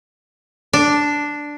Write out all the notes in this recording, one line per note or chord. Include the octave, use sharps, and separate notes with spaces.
D4